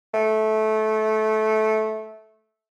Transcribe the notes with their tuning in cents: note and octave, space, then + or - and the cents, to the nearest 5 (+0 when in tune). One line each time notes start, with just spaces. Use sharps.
A3 -15